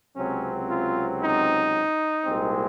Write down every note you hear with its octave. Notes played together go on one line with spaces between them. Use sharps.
C#2 C3 F#3 C4 C#4
F4
D#4
C2 A#2 G#3 C4